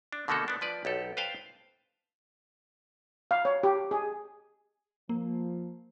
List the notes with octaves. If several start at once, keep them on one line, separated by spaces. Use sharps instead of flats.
D4
B2 D3 A3 A#3 F#4 A4
B3 D4
F3 B4 D5
B1 G4 A4
B4 C5 F5 G5 A5
F5
C#5
G4
G#4
F3 A#3